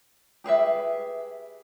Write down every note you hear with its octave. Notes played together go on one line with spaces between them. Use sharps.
G4 G#4 B4 E5